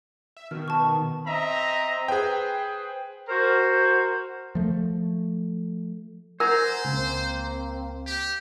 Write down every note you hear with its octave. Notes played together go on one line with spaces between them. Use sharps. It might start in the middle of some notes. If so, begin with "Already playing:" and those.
E5
B2 D#3 F6
A5 C#6
B4
C4 D#5 E5 A#5
G#4 B4 C5 G5
F#4 A#4 C5
F3 A3
A#4 C5 F#5 G#5 A#5
C#2 A#3 C4
G4